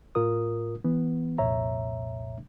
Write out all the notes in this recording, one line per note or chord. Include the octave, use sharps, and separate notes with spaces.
A2 F4 A#4 D#6
E3 B3
C2 F2 A#2 C#5 E5 A#5